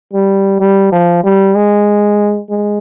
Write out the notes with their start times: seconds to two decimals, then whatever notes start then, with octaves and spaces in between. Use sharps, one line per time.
0.13 G3
0.60 G3
0.92 F3
1.24 G3
1.55 G#3
2.50 G#3